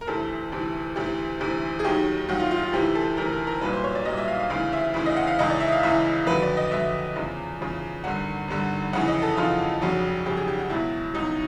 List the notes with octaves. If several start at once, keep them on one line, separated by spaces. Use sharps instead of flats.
A#4
D2 C3 E3 A4
D2 C3 E3
D2 C3 E3 G4
D2 C3 E3
G#4
D#2 D#3 F#3 G4
D#2 D#3 F#3 F#4
F4
F4
F4
D2 C3 E3 G4
A4
D2 C3 E3 A#4
A#4
A#4
C2 A#2 F#3 B4
C5
C#5
D5
C2 A#2 F#3 D#5
E5
F5
F5
D2 C#3 E3 F5
E5
D2 C#3 E3
D#5
F#5
F5
C#2 C#3 E3 D#5
D5
E5
F5
C#2 C#3 E3 E5
F2 D3 F#3 B4
D5
D#5
F2 D3 F#3 E5
E2 C#3 F3
E2 C#3 F3
G#1 G2 D3 F#5
G#1 G2 D3
F2 C#3 E3 F#5
D#5
A4
F2 C#3 E3 F4
F1 F2 C#3 F#3 F#4
F1 F2 C#3 F#3 G4
G#4
G4
F#4
C#2 B2 F#3 E4
C#2 B2 F#3 D#4